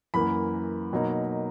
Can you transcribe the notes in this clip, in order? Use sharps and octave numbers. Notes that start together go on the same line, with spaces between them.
F#2 E3 A#3 B5
B2 F#3 A#3 D#4